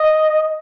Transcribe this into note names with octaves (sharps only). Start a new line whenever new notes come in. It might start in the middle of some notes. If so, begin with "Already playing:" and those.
Already playing: D#5